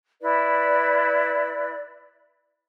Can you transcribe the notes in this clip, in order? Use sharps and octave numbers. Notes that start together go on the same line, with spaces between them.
E4 B4 D5